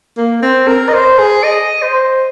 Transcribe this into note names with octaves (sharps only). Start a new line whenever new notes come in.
A#3
C4
A#4
D#5
C5
G#4
D#5
C5